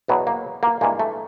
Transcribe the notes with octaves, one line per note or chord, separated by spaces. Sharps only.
E2 B2 F#3 B3
A#3
A#3
G2 E3 G#3 A#3
A3